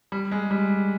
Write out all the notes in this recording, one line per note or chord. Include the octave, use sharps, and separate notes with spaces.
G3
G#3
G3